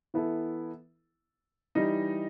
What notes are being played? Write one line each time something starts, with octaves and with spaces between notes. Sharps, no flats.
E3 B3 E4 A4
E3 G3 D#4